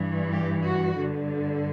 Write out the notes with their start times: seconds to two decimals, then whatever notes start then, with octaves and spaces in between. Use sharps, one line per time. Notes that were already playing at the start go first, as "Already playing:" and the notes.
Already playing: G2 E3
0.33 G4
0.64 F#4
0.97 G2 D3